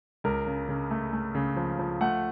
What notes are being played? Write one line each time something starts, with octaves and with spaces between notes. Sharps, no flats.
C#2 A#4
C#3
C#3
A3
A3
C#3
F3
F3
A3 F#5